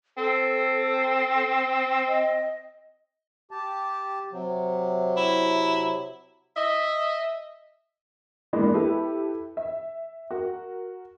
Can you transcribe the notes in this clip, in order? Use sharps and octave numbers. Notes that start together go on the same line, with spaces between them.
C4 A4
D#5
G4 A5
C3 F#3
E4
D#5 E5
E3 G#3 A#3 B3 D4
E4 G4 A4 B4
E5
F#4 A#4